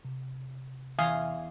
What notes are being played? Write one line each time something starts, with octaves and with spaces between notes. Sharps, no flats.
C3
E2 F5 G#5 C6 D#6